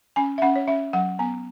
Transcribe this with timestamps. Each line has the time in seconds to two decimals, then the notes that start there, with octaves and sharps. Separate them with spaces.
0.16 C#4 G#5
0.38 E5
0.42 C#4 F#5
0.56 C#5
0.68 C#4 E5
0.93 F#3 F#5
1.19 B3 G#5